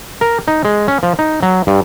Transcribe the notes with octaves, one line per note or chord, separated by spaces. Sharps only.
A#4
D#4
G#3
C#4
F3
D#4
F#3
G2